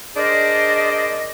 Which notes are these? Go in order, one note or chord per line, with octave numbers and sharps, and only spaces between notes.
D4 G#4 A#4 C5 D5 D#5